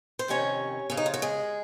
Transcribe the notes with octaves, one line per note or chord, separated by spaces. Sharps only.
C5
F2 C3 D#3 C#4 C#5
F2 C#3 C#4
D#4
F4
F#4
G#3 G#4